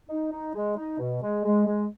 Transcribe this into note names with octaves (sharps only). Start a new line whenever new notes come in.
D#4
D#4
G#3
D#4
B2
G#3
G#3
G#3